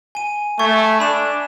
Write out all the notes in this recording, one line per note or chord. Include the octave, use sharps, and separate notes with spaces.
G#5 D#7
A3 C#6 G#6
D4 B5 E7